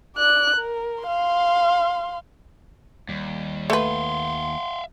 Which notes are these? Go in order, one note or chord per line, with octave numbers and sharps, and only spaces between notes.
D5 F#6
A#4
F5 C6
D#2 G3
A3 B4 E5 F5 C6